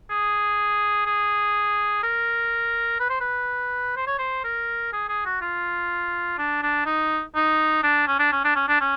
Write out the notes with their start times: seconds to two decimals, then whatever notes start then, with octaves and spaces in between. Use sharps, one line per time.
0.10 G#4
1.06 G#4
2.03 A#4
3.00 B4
3.10 C5
3.21 B4
3.96 C5
4.07 C#5
4.19 C5
4.44 A#4
4.93 G#4
5.09 G#4
5.26 F#4
5.42 F4
6.38 D4
6.63 D4
6.86 D#4
7.35 D#4
7.83 D4
8.07 C#4
8.19 D4
8.32 C#4
8.44 D4
8.56 C#4
8.68 D4
8.81 C#4